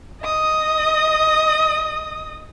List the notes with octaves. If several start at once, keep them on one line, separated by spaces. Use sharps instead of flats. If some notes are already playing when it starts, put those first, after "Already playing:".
D#5 D#6